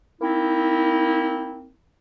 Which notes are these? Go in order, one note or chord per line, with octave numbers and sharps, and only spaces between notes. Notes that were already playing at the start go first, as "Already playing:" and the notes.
A#3 C4 D#4 E4